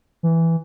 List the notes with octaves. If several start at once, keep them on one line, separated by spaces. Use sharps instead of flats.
E3